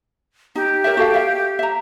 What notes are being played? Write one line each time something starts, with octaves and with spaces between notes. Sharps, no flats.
D#4 G4
A#4 C#5 E5
F#4 A4 F5
E5 F5
E5 A#5